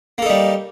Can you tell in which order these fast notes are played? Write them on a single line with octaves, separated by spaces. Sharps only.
A#3 A4 D#4 G3